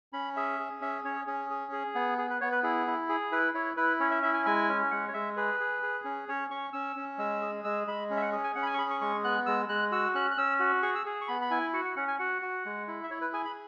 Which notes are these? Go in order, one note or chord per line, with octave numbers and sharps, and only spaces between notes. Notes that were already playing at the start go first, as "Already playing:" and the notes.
C#4 B5
G#4 E5
G#4
C#4 E5
C#4 C#5
C#4 G#4
G#4
G#4
B3
G#4
B4
B3 C#5
B4
E4 G#4
E4
G#4
E4 B4
E4 C#5
E4 B4
C#4 C#5
E5
E4 E5
G#5
G#3 G#5
C#4
G#3 F#5
C#5
G#3 E5
G#4 B4
G#4
G#4
C#4
C#4 C#5
C#4 C#6
C#4 E6
C#4
G#3 E6
G#4
G#3 E6
G#3 B5
C#4
E5
F#5
G#4
G#5
C#4 F#5
B5
G#5
C#6
G#4 B5
C#6
G#3 C#6
B3 F#6
G#3 E6
G#3 F#6
F#4 E6
C#4 F#6
F#6
C#4 E6
F#4
G#4 C#6
E6
G#4
C#6
B3 B5
B5
E4 G#5
F#4 F#5
F#5
C#4 F#5
G#5
F#4 F#5
F#4
G#3
E4
E5
E4 C#5
B4
G#4 G#5
B5